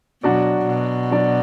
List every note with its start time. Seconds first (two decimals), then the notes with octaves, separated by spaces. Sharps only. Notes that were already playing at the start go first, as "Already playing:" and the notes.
0.23 B2 F#3 D4 F#4 D5
0.67 B2
1.12 F#3 D4 F#4 D5